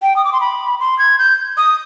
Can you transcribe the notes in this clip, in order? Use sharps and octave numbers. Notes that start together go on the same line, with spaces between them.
G5
D#6
D6
C6
B5
C6
G#6
G6
D#6